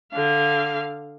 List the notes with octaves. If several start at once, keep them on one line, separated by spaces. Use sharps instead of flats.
D3 F5